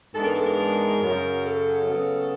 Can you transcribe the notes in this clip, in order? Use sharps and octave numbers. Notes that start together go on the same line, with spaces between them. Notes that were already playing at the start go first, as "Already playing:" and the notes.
G#2 E3 G#3 B3 D4 A4
A#4
A4
A#4
F#2 C#3 F#3
A4
C#3 F#3 B3